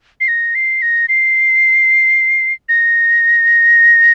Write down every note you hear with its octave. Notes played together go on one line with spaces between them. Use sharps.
C7
A#6
C7
A#6
C7
A#6